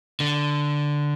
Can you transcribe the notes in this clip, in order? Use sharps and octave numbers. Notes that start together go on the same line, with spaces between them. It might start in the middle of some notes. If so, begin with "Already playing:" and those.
D3